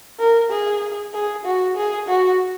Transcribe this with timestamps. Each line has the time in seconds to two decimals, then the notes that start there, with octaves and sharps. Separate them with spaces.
0.19 A#4
0.50 G#4
1.14 G#4
1.45 F#4
1.76 G#4
2.08 F#4